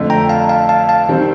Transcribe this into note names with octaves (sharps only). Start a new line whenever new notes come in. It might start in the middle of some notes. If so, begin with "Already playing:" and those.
Already playing: F2 D3 A3
G5 A#5
F5 A5
F5 A5
F5 A5
F5 A5
D#3 G3 C4